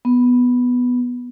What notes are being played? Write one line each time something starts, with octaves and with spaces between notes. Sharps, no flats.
B3